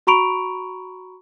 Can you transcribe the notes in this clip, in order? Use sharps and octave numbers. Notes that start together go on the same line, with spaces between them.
F#4 A#5 B5 C#6 D7 F7